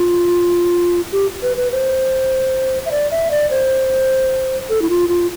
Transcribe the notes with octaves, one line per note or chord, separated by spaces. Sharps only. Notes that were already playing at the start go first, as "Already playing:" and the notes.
Already playing: F4
G4
B4
B4
C5
E5
D5
E5
D5
C5
A4
E4
F4
F4